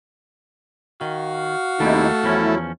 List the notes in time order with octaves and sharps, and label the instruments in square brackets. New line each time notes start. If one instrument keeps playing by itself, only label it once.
[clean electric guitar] D#3 [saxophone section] F#4 F5
[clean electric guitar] D#2 G3 [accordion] C3 D#4 E4 [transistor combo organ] A3
[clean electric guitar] E2 F3 C#4 [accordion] F#3 E4